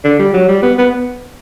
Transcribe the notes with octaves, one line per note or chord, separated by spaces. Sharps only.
D3
G3
F#3
G3
B3
B3